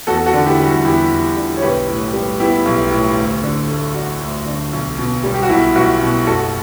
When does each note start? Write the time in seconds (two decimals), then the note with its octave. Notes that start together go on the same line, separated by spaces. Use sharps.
0.07 E2 F#4 A4
0.26 F#4 A4
0.33 D3
0.46 E4 G4
0.60 G3
0.66 F#4
0.85 E2 E4 G4
1.11 E2
1.36 D3
1.56 C#5
1.62 B1 G4 B4
1.88 A2
2.13 G3
2.40 B3 E4 G4
2.65 B1
2.91 A2
3.17 D2
3.43 D3
3.69 A3
3.94 D4 F#4
4.21 D2
4.46 D3
4.73 B1
4.98 B2
5.24 G3
5.34 G4
5.43 F#4
5.49 B1 E4
5.75 B1 F#4
6.01 B2
6.26 F#1 F#4 A4